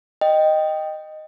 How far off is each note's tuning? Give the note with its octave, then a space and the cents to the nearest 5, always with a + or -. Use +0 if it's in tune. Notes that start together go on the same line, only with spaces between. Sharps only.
D#5 -5 G5 +0